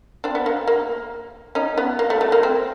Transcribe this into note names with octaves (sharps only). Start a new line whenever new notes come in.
C4 D4
B3
A#3
A#3
C#4 D#4
B3
A#3
A3
A3
A#3
C4